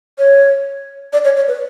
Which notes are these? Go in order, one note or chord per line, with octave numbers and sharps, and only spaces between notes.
C#5
D5
C#5
C#5
B4